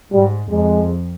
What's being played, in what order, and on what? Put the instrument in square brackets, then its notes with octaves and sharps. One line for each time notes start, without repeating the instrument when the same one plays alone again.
[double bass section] G#2 [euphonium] G3
[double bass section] F2 [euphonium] G#3